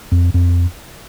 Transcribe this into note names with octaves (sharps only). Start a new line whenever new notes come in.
F2
F2